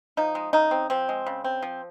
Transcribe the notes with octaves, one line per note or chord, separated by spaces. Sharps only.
F3 D#4
G#3
C#3 D#4
C4
F3 C4
G#3
C#3
C4
F3